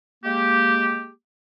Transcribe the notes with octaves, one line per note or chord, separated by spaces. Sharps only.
G#3 A#3 G4